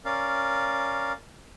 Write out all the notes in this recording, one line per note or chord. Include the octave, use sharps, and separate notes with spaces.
C#4 A#4 D5 F5